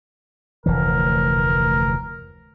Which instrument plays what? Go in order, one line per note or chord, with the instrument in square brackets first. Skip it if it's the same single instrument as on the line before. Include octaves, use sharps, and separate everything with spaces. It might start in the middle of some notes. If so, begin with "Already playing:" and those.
[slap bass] F1 D2 E3 [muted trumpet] A#4